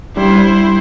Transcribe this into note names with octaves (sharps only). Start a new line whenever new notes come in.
G3 C#4 D4 E4 C5